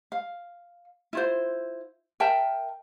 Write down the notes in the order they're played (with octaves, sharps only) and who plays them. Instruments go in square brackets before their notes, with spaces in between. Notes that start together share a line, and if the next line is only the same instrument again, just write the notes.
[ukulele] F5
E4 F4 C5
A#4 E5 G5 A5